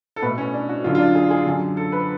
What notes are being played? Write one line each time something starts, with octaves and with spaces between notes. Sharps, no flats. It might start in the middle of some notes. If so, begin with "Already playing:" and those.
A4
B2 A3 B4
C#4
D4
F#4
F#2 D3 F#3 F4
F4
D4
G#4
G#4
F#2 D3 F#3
A4
B4